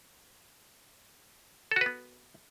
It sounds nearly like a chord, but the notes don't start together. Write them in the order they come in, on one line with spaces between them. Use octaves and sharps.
A4 F#4 B4 B3